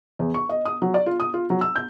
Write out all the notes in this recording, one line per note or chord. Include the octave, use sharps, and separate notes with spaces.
E2
C#6
D#5
D#6
F#3
D5
F4
D#6
F4
F#3
E6
G6